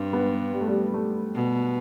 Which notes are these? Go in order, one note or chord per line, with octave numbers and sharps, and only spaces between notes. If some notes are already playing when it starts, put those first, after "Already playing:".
Already playing: G2 C4
B3
G3
A3
G3
A3
B2